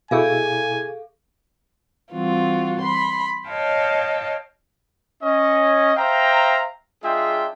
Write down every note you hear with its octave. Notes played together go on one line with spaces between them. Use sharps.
B2 E4 G#4 A4 F5 G#5
E3 G3 C4 F4 F#4
B5 C6
C#5 D#5 F5 G5 A5
C#4 D#5
C5 E5 F5 G5 A#5
G#3 D4 F4 G#4 E5 G5